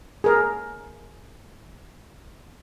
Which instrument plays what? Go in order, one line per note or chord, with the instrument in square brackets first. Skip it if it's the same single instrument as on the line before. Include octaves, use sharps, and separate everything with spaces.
[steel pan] G#4 A#4